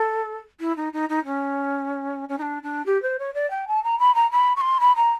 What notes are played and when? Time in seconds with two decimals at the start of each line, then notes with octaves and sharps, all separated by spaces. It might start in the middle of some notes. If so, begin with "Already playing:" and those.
Already playing: A4
0.60 E4
0.77 D#4
0.93 D#4
1.09 D#4
1.25 C#4
2.29 C#4
2.38 D#4
2.42 D4
2.63 D4
2.86 G4
3.02 C5
3.19 C#5
3.34 D5
3.50 G5
3.68 A5
3.84 A#5
3.99 B5
4.15 A#5
4.31 B5
4.56 C#6
4.61 C6
4.80 B5
4.96 A#5